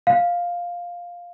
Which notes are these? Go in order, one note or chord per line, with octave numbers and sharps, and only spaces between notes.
F5